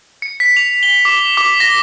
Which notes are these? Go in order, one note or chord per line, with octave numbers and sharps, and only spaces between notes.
C#7
B6
F7
G7
D6
D6
A#6